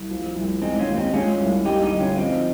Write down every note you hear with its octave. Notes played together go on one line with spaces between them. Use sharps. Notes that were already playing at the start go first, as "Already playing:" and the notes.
Already playing: C2
F3
C2
G#3 C4 D#4
C#4 F4
D#2
C4 D#4
G#3 C#4 F4
C2
G3 D#4 G4
D#4 G4
G1
C#4 F4
F3 C4 D#4